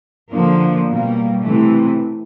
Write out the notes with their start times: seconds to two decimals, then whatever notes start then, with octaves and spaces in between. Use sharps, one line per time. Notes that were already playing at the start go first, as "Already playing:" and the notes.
0.32 D3 F3 A#3
0.88 B2 G3 A#3
1.42 C3 E3 A3